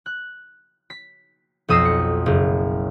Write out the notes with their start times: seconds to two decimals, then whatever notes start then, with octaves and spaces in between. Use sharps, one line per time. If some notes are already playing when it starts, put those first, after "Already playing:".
0.06 F#6
0.90 B6
1.68 B1 F2 D#6 E6 A#6 C7
1.85 C#7
2.26 F#1